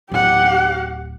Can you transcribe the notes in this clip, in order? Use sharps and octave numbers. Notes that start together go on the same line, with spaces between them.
D1 G4 F#5